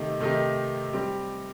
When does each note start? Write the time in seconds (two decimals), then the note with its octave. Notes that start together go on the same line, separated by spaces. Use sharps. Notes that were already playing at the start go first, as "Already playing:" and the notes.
Already playing: C3 D#3 A3 D#4 G4
0.20 C3 D#3 A3 D#4 G4
0.93 G3 C4 G4